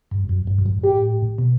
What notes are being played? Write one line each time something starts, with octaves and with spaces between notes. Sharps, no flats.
G2
F#2
G2
F#2
G2
A2 G4
B2